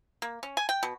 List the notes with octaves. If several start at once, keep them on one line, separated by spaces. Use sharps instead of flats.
A#3
C#4
G#5
G5
B2